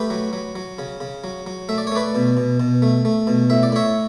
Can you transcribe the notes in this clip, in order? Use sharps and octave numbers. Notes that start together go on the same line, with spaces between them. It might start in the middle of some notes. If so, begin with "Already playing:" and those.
Already playing: A3 G4 B4
F#3
F#3
F#3
C#3
C#3
F#3
F#3
A3 E5
D5
C#5
A3 B4 D5
B2
B2
B2
A3
A3
B2
A2 E5
D5
A2 C#5 E5